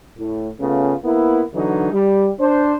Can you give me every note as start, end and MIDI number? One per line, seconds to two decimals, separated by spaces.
0.17 0.49 45
0.59 0.93 49
0.59 0.93 57
0.59 0.93 59
0.59 0.93 61
0.59 0.93 65
1.04 1.42 58
1.04 1.42 59
1.04 1.42 64
1.54 1.90 50
1.54 1.90 52
1.54 1.90 54
1.54 1.90 62
1.54 1.90 63
1.92 2.28 55
2.40 2.75 62
2.40 2.75 72